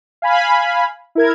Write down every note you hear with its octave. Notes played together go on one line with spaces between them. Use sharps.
F5 G#5 B5
E4 A#4 G#6